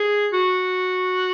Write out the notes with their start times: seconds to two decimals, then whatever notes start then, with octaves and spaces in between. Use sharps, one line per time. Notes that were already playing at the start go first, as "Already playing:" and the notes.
Already playing: G#4
0.33 F#4